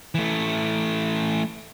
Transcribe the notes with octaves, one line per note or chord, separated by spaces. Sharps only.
E3 A3